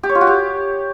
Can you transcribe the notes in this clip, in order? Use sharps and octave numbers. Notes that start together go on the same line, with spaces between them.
G4
C#5
F4
F#4
G4